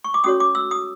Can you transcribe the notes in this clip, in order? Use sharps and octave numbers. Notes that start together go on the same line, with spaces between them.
C#6
D6
C#4 F#4 A4 C#5 D#6
D6
E6
D#6